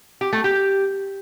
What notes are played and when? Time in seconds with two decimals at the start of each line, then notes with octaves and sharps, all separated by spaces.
0.21 G4
0.33 A3
0.44 G4